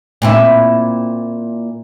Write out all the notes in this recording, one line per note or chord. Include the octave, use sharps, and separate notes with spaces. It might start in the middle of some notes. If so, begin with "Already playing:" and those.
A#2 C4 E4